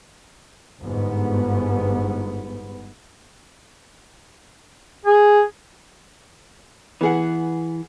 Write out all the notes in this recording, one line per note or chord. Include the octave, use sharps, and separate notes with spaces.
G1 G#2 B3
G#4
E3 B3 G#4 F#5